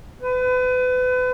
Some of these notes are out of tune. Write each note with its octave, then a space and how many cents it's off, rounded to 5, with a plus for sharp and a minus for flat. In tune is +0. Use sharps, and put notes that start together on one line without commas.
B4 +35